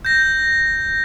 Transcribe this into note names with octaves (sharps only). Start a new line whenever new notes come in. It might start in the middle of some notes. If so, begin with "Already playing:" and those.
G6 A#6